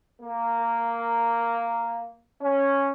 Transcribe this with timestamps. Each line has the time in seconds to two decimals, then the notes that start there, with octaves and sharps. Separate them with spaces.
0.21 A#3
2.41 C#4